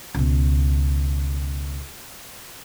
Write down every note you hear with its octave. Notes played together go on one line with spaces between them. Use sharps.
C#2 B2